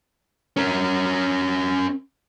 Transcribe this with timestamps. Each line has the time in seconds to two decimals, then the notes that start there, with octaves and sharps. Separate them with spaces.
0.57 C#4 A#4